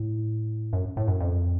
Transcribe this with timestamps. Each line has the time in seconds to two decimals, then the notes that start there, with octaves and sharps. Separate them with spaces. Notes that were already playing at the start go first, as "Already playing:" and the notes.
Already playing: A2
0.73 F#2
0.97 A2
1.08 F#2
1.20 F2